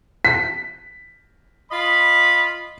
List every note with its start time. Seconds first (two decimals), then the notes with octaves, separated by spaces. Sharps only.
0.25 B6
1.71 F4 D#5 B5